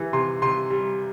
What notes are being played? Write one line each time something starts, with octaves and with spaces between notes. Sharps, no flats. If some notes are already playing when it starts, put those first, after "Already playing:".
Already playing: E3 G3
C3 C6
C3 C6
G3